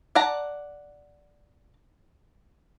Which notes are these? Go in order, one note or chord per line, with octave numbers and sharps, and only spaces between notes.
D5 F#5 A5 A#5